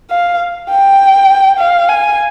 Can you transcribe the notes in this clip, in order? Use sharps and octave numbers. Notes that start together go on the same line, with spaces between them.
F5
G5
F5
G#5